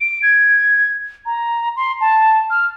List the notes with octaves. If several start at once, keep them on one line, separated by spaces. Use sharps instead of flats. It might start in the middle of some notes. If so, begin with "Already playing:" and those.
D7
G#6
A#5
C6
A5
F6